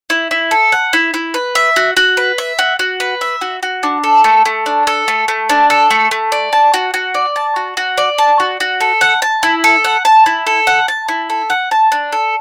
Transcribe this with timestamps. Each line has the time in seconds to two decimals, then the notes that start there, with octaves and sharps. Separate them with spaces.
0.10 E4
0.31 E4
0.51 A4
0.72 F#5
0.93 E4
1.14 E4
1.34 B4
1.55 E5
1.76 F#4
1.97 F#4
2.17 B4
2.38 E5
2.59 F#4
2.79 F#4
3.00 B4
3.21 E5
3.41 F#4
3.63 F#4
3.83 D4
4.04 A4
4.24 A3
4.46 A3
4.66 D4
4.87 A4
5.08 A3
5.28 A3
5.49 D4
5.70 A4
5.91 A3
6.11 A3
6.32 D5
6.53 A5
6.74 F#4
6.94 F#4
7.14 D5
7.36 A5
7.56 F#4
7.77 F#4
7.98 D5
8.18 A5
8.40 F#4
8.60 F#4
8.81 A4
9.01 F#5
9.22 A5
9.43 E4
9.64 A4
9.85 F#5
10.05 A5
10.26 E4
10.47 A4
10.67 F#5
10.88 A5
11.09 E4
11.30 A4
11.50 F#5
11.71 A5
11.92 D4
12.12 A4